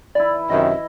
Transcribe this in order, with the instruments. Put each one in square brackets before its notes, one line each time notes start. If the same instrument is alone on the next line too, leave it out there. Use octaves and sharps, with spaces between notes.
[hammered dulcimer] E3 E4 [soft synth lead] D5
[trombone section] F#2 C3 D#3 [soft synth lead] D#5 [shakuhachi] E5